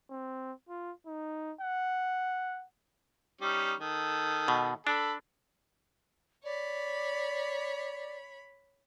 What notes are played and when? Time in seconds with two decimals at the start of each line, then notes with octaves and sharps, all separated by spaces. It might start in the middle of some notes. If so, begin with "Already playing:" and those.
0.10 C4
0.69 F4
1.06 D#4
1.61 F#5
3.41 G3 C#4 D#4
3.80 D#3 A4
4.48 B2
4.87 D4 A4 B5
6.44 C#5 D5 B5